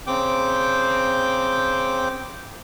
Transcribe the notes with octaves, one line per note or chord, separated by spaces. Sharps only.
C#3 C4 G5 D6 G6